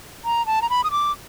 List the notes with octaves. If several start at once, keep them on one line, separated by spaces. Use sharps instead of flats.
A#5
A5
A#5
B5
D#6
D6